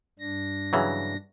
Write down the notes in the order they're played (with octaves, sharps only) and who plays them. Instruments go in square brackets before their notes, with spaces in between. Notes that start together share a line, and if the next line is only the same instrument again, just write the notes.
[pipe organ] G2 D4 A#6
[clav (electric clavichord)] C#3 E3 F#3